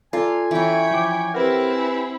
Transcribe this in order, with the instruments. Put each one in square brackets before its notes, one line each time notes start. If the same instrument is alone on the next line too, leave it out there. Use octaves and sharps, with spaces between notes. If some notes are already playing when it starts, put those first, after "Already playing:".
[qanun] F4 [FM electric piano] A4 D5 A#5 [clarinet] G#5
[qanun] E3 C#4 [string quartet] C#5 G5 B5
[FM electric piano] F3 D6
[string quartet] C4 E4 [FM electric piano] G4 B4 F#5 [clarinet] A#4
[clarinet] G#5